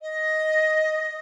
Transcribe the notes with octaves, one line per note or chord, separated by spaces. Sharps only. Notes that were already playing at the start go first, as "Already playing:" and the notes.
D#5